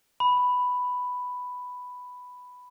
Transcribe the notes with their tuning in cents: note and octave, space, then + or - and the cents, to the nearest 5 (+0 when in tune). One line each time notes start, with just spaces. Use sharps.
B5 +5